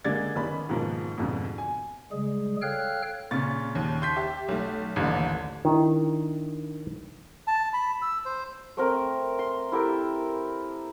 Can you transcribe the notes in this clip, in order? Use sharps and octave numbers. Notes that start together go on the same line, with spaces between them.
D3 G#3 A#3 D5 G#6 A6
A1 D#3 B3 C#4 B5
G#2 B2 D#3 F3 A#3
F2 G#2 B2 D3
G#5
C#3 G3 G#3 G#4
A4 C#5 F5 G5 F6 F#6
A#2 C#3 C#6 A6
D#2
C6 G6 B6
G4 E5
B1 A3
A1 D#2 D3
D#3 D4 E4
A5
B5
E6
C5
A3 C4 A#4
C6
E4 G4 A4 A#4